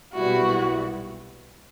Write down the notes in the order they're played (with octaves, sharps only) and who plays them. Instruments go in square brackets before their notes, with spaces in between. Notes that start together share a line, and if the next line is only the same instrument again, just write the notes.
[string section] B1 A#2 G3 B3 E4 [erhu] F#4